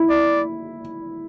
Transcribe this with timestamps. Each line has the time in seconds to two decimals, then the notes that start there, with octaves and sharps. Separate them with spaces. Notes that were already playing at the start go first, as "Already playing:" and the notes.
Already playing: E4
0.09 D5